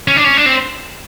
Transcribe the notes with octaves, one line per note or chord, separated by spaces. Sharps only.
C#4
D4
C#4
D4
C4